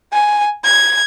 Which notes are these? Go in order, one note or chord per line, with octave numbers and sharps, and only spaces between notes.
G#5
G#6